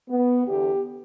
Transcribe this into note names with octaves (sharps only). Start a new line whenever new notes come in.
B3
E2 D3 G4